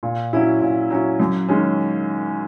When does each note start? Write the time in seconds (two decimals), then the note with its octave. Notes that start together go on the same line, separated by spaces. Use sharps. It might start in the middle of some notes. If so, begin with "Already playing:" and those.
0.03 A#2
0.33 F#3 C#4 E4
0.62 A#2
0.90 F#3 C#4 E4
1.20 F#2
1.49 D#3 G#3 C#4